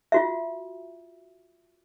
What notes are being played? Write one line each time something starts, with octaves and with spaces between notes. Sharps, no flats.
F4 F#4 E5